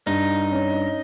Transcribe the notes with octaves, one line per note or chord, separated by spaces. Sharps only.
G2 D#4
C#4